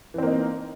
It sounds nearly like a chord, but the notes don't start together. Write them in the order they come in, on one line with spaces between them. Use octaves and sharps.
E3 C4 A#3 D#4